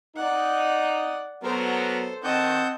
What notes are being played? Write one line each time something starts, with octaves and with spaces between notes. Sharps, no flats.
D#4 D5 F#5
F#3 B3 A4 A#4 C5
D#3 C4 D#5 F#5 A5 G6